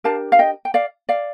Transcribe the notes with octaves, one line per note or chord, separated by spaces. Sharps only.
D4 G4 A#4 F5 A5
F5
D#5 G5
G5
D5 F5
D5 F5